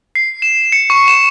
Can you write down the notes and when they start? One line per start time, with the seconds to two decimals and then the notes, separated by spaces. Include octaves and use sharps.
0.15 C7
0.42 E7
0.72 C#7
0.90 C#6
1.08 E7